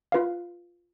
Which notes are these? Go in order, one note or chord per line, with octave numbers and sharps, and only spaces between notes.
F4 B4 F5